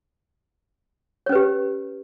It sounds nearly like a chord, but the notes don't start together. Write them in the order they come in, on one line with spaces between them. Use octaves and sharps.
C#5 C#4 B4 G4